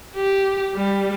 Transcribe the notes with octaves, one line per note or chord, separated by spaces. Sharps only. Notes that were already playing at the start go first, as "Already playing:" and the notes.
G4
G3